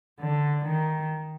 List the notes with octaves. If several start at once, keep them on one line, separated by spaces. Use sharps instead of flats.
D3
D#3